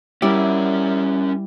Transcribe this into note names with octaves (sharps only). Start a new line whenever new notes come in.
G3 C#4 E4 A#4 D5